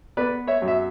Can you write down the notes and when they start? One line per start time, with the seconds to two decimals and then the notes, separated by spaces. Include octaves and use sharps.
0.17 B3 B4 D5
0.47 C#5 E5
0.62 F#2
0.68 E5